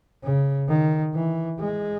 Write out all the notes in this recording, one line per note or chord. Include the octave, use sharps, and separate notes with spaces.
C#3
D#3
E3
G#3